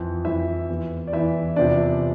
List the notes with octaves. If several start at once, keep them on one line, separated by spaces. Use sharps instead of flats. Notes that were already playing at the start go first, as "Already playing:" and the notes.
Already playing: F2 E3
F2 E3 E4 E5
E2 E3
D5
E2 E3 E4 E5
E2 C3 F3 D4 D5